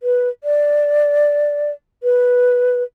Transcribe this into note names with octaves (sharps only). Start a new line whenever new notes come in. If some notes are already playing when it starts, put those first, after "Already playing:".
B4
D5
B4